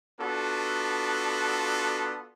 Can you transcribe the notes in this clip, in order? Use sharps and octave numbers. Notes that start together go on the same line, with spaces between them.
B3 D4 F4 F#4 A4